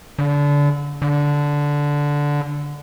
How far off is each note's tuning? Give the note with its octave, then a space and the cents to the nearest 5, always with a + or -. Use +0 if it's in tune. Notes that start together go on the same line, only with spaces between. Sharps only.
D3 -25
D3 -10